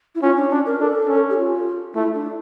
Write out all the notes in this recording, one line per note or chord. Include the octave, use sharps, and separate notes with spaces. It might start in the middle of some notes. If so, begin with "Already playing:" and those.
E4
C#4 F4
D4
C#4 D4
A#4
D4 A4
C#4
G4
F4
A3 E4
D4